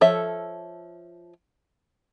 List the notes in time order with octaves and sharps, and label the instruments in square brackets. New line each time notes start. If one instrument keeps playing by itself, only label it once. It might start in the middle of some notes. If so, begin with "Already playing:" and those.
[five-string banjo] F3 A4 C#5 E5